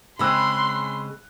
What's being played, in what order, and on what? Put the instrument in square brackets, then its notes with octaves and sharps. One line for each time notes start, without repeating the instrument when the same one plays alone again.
[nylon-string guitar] C#3 G#3 C4 [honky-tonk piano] B5 E6 F#6 [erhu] C6